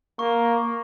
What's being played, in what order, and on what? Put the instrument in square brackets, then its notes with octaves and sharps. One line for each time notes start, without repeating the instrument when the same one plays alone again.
[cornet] A#3 [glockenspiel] C#6